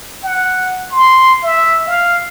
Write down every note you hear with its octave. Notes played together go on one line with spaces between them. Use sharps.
F#5
C6
E5
F5